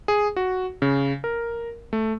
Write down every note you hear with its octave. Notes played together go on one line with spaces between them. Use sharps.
G#4
F#4
C#3
A#4
A3